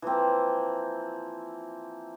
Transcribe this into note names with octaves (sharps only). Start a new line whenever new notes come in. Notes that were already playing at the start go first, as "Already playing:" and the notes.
E3 F3 A#3 C4